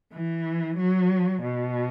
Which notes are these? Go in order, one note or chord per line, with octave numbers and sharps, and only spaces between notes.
E3
F#3
B2